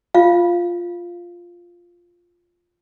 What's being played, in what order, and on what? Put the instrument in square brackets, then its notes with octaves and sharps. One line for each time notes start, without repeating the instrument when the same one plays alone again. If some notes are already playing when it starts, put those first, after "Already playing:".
[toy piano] F4 F5